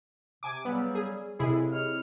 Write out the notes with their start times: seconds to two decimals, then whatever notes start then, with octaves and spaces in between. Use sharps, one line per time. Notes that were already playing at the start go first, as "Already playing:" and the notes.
0.43 C3 G#5 D6
0.65 C#3 F#3 G3 B3
0.95 G#4
1.39 C#2 C3 G#3 E4 G#4 A4
1.71 D#3 C#5 F6